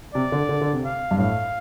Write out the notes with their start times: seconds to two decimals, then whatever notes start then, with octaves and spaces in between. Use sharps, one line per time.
0.14 C3 D5
0.32 D3
0.49 D3
0.61 D3
0.73 C3
0.84 F5
1.11 G2
1.18 A2 F5